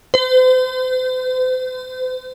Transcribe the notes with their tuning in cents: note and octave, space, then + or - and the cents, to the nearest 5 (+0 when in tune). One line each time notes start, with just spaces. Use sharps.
C5 -40